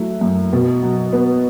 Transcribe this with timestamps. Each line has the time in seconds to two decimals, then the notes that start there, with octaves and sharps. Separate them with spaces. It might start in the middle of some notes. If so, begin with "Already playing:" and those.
Already playing: F#3 A3 E4
0.21 F#2
0.53 B2
0.83 F#3
1.13 B3